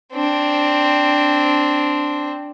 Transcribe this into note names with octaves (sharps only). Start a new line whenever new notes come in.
C4 D4